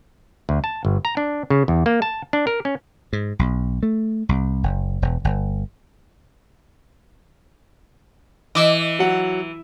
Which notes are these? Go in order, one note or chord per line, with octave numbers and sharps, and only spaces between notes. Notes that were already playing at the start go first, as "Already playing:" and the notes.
D2
A5
G1
A#5
D4
C#3
E2
A#3
A5
D4
A#4
C#4
G#2
B1
A3
C2
F#1
E1
G1
E3 D#5 D6 E6
F#3 F#5